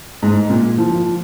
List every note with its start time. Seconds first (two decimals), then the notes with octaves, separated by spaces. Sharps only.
0.22 G#2
0.50 A#2
0.78 F3